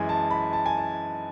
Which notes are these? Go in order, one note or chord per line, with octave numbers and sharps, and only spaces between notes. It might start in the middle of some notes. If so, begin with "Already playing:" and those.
Already playing: F#2 E3 G#3 G#5
A5
B5
A5
G#5
A5